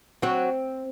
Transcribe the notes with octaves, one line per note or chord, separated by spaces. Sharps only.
F#3 C4 F#4